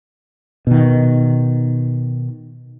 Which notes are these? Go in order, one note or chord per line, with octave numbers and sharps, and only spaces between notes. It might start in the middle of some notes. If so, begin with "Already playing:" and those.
B2 D#3